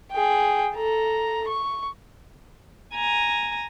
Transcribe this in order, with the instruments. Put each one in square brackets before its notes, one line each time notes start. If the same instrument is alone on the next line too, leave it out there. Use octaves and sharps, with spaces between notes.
[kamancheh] G#4 G5
A4 A#5
C#6
[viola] G#5 A#5